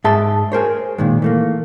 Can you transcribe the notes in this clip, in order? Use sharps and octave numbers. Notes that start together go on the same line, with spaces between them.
G#2 G#4 E5 A5 C6
G#4 A#4 C5 C#5
A#2 D#3 G#3
E3 A3 A#3